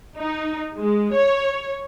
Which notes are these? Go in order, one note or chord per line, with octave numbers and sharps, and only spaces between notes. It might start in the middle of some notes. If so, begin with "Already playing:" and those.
D#4
G#3
C#5